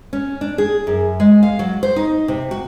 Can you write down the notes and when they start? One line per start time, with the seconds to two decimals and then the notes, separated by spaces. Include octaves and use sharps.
0.13 C#4
0.41 D4
0.58 G#4
0.87 F#2
1.20 G#3
1.43 F5
1.59 F#3
1.83 C5
1.96 D#4
2.28 C3
2.51 F#4